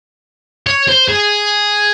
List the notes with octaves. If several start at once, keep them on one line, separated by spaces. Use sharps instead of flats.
C#5
C5
G#4